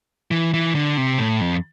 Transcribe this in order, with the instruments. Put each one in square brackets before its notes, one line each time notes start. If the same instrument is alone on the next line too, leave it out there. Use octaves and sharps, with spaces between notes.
[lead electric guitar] E3
E3
D3
C3
A2
F2